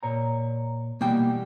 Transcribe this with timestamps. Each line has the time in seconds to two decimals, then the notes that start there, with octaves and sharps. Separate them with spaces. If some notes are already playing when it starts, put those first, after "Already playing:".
0.03 A#2 C#5 A#5
1.01 B2 E3 G3 A#3 G5